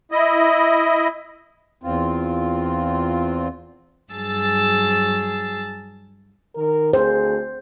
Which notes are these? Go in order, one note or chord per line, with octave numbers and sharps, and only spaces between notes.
E4 D#5
E2 C4 F4
G2 F#3 G#4 A5 E6 A6
D#3 A#4
D2 G#4 C5